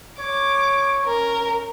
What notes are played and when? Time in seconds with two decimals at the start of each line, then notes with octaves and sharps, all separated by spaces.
0.19 C#5 D6
1.05 C#4 A#4